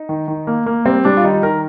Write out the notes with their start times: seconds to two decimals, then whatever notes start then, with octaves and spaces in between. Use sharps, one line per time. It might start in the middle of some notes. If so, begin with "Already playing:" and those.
Already playing: D#4
0.09 D#3
0.28 D#3
0.47 A#3
0.66 A#3
0.85 G3 C4
1.05 G3 D4
1.17 F4
1.24 D#3 D#4
1.43 D#3 A#4